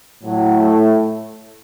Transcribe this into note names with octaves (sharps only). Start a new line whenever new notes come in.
A2 F#3
A3